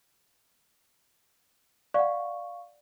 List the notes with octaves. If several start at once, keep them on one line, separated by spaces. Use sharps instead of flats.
D5 F5 F#5 C#6